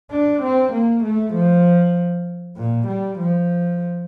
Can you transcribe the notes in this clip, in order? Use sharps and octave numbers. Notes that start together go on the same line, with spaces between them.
D4
C4
A#3
A3
F3
A#2
G3
F3